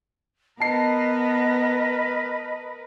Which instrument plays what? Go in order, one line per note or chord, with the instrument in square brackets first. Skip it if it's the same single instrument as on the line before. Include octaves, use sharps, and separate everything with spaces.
[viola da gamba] B3 [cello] A#4 B4 [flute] D#5 [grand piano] A5 C7